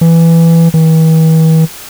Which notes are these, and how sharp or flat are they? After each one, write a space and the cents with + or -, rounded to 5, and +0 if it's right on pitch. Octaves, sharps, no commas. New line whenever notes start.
E3 +10
E3 -45